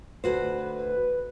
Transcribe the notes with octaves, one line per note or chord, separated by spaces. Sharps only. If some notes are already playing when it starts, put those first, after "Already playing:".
D2 F#4 B4 C5